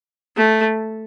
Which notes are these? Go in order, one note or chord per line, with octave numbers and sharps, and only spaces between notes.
A3